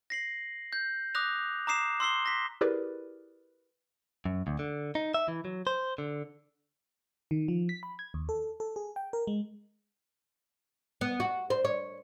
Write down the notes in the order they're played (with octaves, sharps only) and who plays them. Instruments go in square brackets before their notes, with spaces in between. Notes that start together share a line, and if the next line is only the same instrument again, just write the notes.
[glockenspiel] A#6 C7 F#7
G6
D6 D#6 F#6 A#6 F7
A#5 D6 D#6 C7 E7
C6 E6 C7 G7
A#6 B6
[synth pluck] E4 G4 G#4 A#4 B4 D5
[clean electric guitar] F#2
D2
D3
D#4
E5
E3
F#3
C5
D3
[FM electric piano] D#3
F3
B6
B5
G#6
D#2
A4
A4
G#4
G5
A#4
G#3
[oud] B3
F#4
C5
C#5